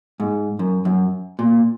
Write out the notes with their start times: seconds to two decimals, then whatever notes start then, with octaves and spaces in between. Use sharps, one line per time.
0.20 G#2
0.59 F#2
0.85 F#2
1.39 A#2